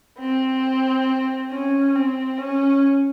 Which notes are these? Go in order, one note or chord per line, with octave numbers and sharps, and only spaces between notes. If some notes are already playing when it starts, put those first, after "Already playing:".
C4
C#4
C4
C#4